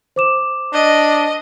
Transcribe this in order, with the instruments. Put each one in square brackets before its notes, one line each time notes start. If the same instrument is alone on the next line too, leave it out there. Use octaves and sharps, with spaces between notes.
[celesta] C5 D6 E7
[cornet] D4 [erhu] D#5